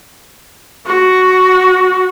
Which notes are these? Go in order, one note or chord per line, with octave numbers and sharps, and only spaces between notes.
F#4